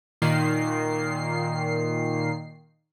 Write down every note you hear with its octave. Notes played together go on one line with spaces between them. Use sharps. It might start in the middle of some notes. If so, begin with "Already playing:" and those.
A#2 D#3 C7